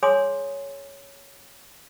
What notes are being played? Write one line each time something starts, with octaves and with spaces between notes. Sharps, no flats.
G#4 C#5 G#5 C6 D#6